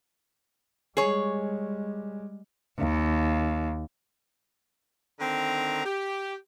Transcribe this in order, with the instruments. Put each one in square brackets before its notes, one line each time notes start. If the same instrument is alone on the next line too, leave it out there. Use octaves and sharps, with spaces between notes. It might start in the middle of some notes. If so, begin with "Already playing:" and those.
[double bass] G3 G#3 [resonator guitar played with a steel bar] G#4 C#5
[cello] D#2
[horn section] D3 D#3 C4 A#5
G4